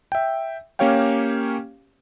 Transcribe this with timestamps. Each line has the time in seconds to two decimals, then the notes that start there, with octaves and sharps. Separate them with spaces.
0.12 E5 G5
0.79 A#3 C#4 G4 C#5 F5 G5